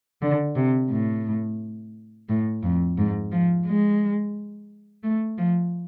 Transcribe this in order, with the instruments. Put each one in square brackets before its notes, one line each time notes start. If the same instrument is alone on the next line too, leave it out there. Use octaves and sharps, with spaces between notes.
[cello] D3
C3
A2
A2
F2
G#2
F3
G#3
A3
F3